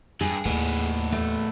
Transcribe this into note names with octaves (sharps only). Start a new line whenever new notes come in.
G2 G#4
D#2 A2 B3
A3